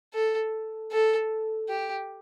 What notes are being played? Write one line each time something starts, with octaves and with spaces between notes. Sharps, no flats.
A4
A4
G4